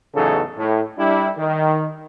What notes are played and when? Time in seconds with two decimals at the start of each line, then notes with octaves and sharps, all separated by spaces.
0.15 A1 E2 C#3 F#3 D#4 A4
0.57 A2
0.98 G3 D4 E4
1.37 D#3